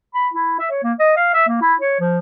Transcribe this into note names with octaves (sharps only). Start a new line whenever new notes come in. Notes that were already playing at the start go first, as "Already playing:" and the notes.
B5
E4
E5
C#5
A#3
D#5
F5
E5
A#3
E4
C#5
F3